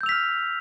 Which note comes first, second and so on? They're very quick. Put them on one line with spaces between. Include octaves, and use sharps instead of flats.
G6 E6 F7 B6 F6